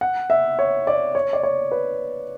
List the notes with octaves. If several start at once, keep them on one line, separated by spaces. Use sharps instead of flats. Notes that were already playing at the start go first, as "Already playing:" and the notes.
F#5
E5
C#5
D5
C#5
D5
C#5
B4